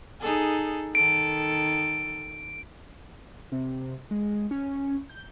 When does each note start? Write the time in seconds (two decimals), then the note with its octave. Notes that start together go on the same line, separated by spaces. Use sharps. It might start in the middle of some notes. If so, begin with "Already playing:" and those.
0.21 D#4 G#4 A4
0.95 D#3 A4 D7
3.52 C3
4.11 G#3
4.51 C#4
5.10 G6